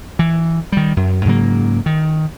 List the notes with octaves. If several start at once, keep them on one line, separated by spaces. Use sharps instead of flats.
E3
D#3 G3
F#2
G#2 C#3 F#3 A#3
D#3